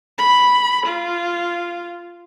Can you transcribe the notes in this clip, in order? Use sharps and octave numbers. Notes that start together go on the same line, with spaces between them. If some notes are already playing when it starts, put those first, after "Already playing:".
B5
F4